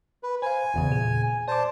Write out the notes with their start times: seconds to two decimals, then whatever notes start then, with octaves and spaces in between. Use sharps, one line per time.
0.23 B4
0.42 C5 F5 G#5
0.74 G1 E2 C#3
0.90 A#2 G#4
1.48 C5 D5 A5 D6